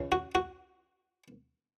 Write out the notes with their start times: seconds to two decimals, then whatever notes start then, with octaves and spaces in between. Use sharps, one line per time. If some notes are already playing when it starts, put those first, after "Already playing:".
Already playing: C#2 C#3
0.12 F#4
0.35 F#4